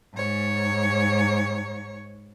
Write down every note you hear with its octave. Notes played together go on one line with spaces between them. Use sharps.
G#2 C#5